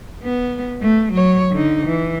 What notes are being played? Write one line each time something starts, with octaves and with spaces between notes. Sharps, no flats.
B3
A3
F#3 C#5
D3 D#4
E3